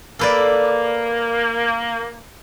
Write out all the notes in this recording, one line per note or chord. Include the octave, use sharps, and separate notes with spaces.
A#3 A4 B4 D5